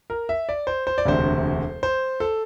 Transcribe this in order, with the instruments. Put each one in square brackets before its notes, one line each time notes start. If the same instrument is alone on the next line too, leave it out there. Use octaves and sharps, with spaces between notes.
[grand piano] A#4
E5
D5
C5
C5
D5
E1 D2 C3 C5
C5
A4